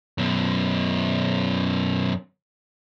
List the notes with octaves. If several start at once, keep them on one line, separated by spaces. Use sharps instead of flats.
F#2 B2